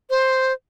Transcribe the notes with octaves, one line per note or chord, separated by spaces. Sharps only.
C5